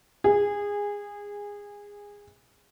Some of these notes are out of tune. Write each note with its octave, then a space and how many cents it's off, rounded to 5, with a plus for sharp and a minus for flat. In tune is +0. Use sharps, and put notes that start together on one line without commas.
G#4 -20